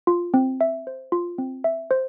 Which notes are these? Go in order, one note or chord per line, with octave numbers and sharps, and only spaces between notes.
F4
C4
E5
C5
F4
C4
E5
C5